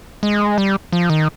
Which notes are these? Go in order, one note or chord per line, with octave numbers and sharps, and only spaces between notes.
G#3
G3
F3
D#3